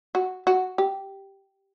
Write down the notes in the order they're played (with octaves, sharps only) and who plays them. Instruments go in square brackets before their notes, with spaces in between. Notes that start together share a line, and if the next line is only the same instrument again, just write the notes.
[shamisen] F#4
F#4
G4